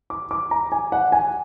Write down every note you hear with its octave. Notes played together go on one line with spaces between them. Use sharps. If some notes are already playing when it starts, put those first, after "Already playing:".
D6
D6
A#5
G#5
F#5
G#5